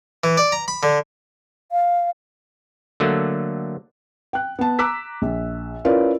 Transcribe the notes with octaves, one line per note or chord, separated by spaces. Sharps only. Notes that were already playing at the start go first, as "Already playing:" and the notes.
E3
D5
A#5
B5
D3
F5
D3 F#3 A3 A#3
G5 F#6
B3 A5
A#5 D6 E6 F#6 B6
A#1
C#4 E4 F4 A#4 B4 D5